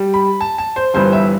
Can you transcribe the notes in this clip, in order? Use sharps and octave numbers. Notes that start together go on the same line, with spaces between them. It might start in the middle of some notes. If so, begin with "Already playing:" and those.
Already playing: G3
B5
A5
A5
C5
G1 G2 E3 C5
E5